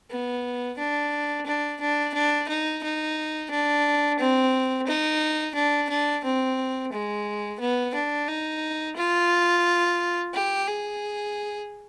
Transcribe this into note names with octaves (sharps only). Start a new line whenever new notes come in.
B3
D4
D4
D4
D4
D#4
D#4
D4
C4
D#4
D4
D4
C4
G#3
B3
D4
D#4
F4
G4
G#4